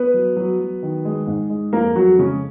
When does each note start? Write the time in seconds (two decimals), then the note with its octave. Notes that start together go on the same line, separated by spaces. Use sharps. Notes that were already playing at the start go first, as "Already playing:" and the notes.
Already playing: B3 B4
0.14 F#3
0.36 F#3
0.60 F#3
0.83 D#3
1.05 G#3
1.27 G#2
1.50 G#3
1.73 F2 A#3 A#4
1.96 F2 F#3 F#4
2.18 C#3 G#3 C#4